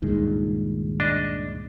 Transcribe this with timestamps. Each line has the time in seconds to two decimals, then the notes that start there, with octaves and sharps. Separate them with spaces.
0.02 C#2 G2 A#2 D#3 G#3
1.00 D4 D#5